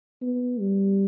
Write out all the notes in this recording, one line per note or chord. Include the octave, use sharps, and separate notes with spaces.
B3
G3